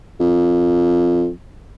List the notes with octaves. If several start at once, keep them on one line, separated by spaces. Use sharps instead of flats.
F2